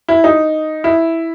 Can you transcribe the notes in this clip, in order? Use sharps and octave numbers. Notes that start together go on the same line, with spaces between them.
E4
D#4
E4